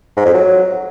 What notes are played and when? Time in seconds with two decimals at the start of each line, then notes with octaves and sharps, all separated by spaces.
0.17 G#2
0.25 F2
0.34 F#3